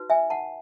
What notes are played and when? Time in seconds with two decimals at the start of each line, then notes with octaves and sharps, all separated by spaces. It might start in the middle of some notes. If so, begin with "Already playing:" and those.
Already playing: D#4 F#4 B4
0.10 E5 G#5
0.30 F#5 A5